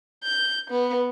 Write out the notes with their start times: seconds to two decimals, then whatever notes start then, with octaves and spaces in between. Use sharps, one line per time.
0.24 G6
0.70 B3